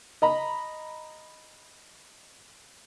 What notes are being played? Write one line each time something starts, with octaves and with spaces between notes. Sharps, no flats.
D#5 A#5 B5